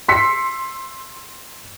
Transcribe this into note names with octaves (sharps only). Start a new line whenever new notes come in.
C6 E6 B6 C#7